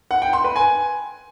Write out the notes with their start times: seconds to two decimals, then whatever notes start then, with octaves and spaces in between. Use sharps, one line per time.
0.11 F#5
0.22 G5
0.33 C6
0.44 B4
0.56 G#5